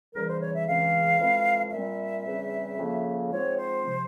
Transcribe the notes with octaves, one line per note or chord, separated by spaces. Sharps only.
E2 C#3 E3 G3 A#4
C5
C#5
E5
C#2 C#3 E3 G#3 C4 F5
F2 E3 G#3 C4
A#2 G3 C4 E5
E2 C#3 G3 C4
F2 C#3 F3 A#3
G#2 F3 G#3 C4 C#5
C5
C3 F3